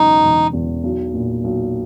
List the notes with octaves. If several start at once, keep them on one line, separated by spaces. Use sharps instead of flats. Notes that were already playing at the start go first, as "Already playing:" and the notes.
Already playing: E1 E2 C#3 F#3 D#4
E1
E2
B1
A#2
B1